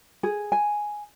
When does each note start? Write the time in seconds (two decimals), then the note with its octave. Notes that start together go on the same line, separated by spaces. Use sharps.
0.23 G#4
0.52 G#5